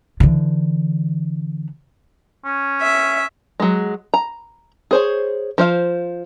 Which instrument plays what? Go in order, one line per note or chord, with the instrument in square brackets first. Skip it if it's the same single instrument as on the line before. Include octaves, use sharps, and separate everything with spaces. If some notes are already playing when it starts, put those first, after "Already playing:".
[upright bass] D3 E3
[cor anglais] C#4
[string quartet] E5
[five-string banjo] F#3 G#3
A#5
G#4 C5 C#5
F3 C5 F5